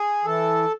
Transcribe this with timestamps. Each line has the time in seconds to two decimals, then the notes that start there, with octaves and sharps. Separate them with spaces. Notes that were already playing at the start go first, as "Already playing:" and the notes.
Already playing: G#4
0.24 E3 A4